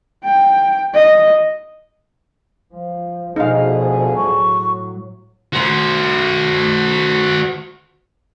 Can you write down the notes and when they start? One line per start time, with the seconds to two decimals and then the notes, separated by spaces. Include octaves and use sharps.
0.24 G5
0.94 D#5
2.74 F3
3.36 D2 B2 F3 D#4 G#4 F5
4.16 A2 F#3 C#6
5.53 F#4 C5